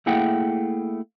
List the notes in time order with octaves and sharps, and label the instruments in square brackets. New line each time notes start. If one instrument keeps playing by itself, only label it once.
[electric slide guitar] A3 A#3 E4 G#4 F#5 G5